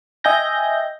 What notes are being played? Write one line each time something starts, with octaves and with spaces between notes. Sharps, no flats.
D#5 E5 G5 G#5 G6 A#6